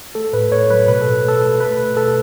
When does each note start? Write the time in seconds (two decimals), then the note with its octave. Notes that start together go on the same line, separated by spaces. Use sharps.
0.15 A3 A4
0.33 A2 B4
0.51 A2 C#5
0.70 F#3 B4
0.87 B2 B4
1.02 B2 A4
1.24 A3 A4
1.42 A3
1.60 A3 B4
1.78 B2
1.96 B2 A4